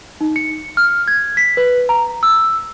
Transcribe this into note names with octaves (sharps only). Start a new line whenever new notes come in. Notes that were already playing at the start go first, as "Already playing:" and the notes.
D#4
C#7
F6
G#6
B6
B4
A#5
E6